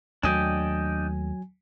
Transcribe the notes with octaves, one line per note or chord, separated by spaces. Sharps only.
D#2 F#3 A3 D4 D#5 G5 G#5